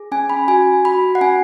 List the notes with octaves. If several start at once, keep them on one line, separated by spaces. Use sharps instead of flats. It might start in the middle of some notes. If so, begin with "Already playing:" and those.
Already playing: G#4
C#4 G#5
B5
F#4 G#5
F#4 B5
F#5
C#4 G#5